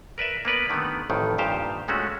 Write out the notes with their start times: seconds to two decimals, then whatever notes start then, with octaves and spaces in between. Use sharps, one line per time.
0.18 A#4 B4 D5 E5
0.45 A#3 B3 B4 D5
0.70 D3 D#3 G3 A3 B3
1.10 A1 F2 A2 D#3
1.38 G2 A#2 D#3 G4 C5 F5
1.88 A#2 G#3 A3 C#4 F#4